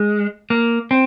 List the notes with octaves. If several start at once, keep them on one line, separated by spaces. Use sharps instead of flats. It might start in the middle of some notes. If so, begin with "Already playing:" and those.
Already playing: G#3
A#3
C4